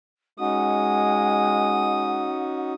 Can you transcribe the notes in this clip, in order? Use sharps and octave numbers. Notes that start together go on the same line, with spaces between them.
G#3 C#4 D#4 F#4 F#5 D#6